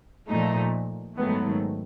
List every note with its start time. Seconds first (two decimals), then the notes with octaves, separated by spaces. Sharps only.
0.28 A#2 F3 A3 D#4
1.17 G#2 D#3 F#3 A3 B3